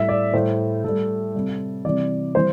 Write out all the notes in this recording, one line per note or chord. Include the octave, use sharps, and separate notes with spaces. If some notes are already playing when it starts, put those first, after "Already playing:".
Already playing: A2 G3 E5
D5
A2 G3 C5
A2 G3 A4
C3 G3
C3 E3 G3 D5
E3 G3 C5